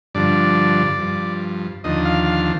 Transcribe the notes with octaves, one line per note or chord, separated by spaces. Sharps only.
G2 D3 F3 D5
G2 F3
D#2 D3 F3 D#5
F5
F5